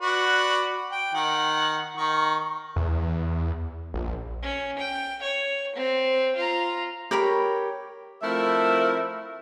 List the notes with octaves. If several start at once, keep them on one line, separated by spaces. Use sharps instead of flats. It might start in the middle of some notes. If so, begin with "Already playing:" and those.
F#4 B4 D5
G5
D#3 F#5
D#3 C#6
E2
A#1
C#4
G5
C#5
C4
F4 A#5
G4 A#4 C#5 B5
F3 A3 C4 E4 A#4 E5